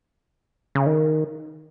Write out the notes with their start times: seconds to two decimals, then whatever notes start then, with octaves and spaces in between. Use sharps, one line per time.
0.75 C#3
0.86 D#3